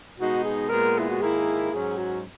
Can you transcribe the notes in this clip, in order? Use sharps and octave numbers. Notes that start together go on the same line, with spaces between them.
B2 G#3 D#4 F#4
G#4
A#2 G#3 B3 A#4
E4
F#4
G#2 D#3 A#3 E4 G#4
G#2 F#3 C#4 G#4
F#4